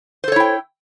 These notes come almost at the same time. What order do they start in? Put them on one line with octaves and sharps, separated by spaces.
C5 A4 C#5 E4 G5